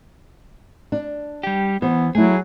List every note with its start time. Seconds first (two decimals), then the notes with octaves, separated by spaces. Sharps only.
0.92 D4
1.43 G3 G4
1.82 E3 B3 C5
2.15 F#3 A3 E4 G#4